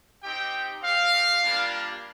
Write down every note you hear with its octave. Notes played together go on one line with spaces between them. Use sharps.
C4 D#4 G4 G5
C4 G4 F5
G3 A#3 D4 F4